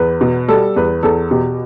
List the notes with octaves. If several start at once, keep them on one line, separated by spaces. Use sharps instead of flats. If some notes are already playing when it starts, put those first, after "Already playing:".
Already playing: E2 B4
B2
G3 A4
E2 B4
E2 A4
B2 G4